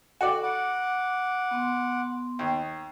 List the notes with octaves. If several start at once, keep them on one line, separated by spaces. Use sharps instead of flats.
F#4 A4 D5
F#5 B5 D6
B3 C6
D#2